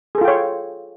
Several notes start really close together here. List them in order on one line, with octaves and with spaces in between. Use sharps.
G#4 A4 F4 G5 C#5